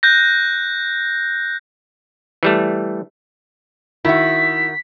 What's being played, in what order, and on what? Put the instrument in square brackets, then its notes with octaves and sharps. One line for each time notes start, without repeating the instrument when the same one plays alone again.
[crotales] F#6 G6 A#6
[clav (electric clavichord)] E3 G3 A3
[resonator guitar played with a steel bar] D#3 F#4 [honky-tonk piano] E4 [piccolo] B6